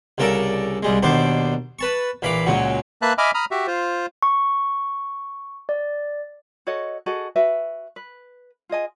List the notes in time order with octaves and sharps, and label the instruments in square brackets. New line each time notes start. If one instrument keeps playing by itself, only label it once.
[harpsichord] C2 C#3 A4 A#4 D5
C2 G3 G#3
D#2 B2 D4 C5 D6
B4 A5 C#6
A#1 E3 F5 B5 D6
C#2 A#2 C#3 F#3 C#4
[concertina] A#3 B4 E5 A5 F#6
D#5 E5 G#5 B5 D6 F6
A#5 B5 D#6 F6
F#4 G4 E5
F4 C5
[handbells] C#6
D5
[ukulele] F#4 A4 C#5 D#5
F#4 G#4 A4 D#5
F#4 B4 E5
B4
F4 G#4 D#5 G#5